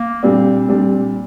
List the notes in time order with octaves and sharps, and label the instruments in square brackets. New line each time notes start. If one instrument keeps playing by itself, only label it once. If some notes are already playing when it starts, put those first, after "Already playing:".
Already playing: [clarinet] A#3
[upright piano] A#2 G3 D4 [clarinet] C4
[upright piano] A#2 G3 D4